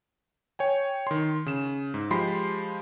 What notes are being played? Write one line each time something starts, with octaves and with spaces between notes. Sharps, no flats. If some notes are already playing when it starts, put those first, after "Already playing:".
C#5 G5 G#5
D#3 C6
C#3 E7
G#2
F3 G#3 G4 B5 C6 C7